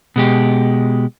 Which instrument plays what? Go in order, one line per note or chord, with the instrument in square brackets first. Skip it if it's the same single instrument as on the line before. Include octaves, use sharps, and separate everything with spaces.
[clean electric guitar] B2 G#3 G4